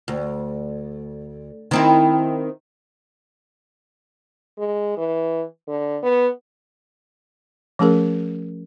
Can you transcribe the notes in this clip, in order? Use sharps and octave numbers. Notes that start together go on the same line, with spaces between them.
D2
D#3 C4 E4
G#3
E3
D3
B3
F3 A3 C#4 G#4 A#4